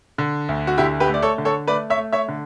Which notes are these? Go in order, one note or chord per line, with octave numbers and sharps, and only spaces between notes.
D3
D2
F#4
D3 E4 G4
G4 B4
A3
D5
A4 C#5
D3
A4 C#5
A3 B4 D5
C#5 E5
A3
C#5 E5
D3